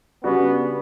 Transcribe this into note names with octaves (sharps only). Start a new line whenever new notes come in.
C#3 G3 B3 D4 F#4